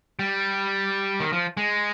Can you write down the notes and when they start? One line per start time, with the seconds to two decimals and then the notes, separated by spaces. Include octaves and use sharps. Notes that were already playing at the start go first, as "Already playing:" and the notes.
0.19 G3
1.20 D#3
1.33 F3
1.57 G#3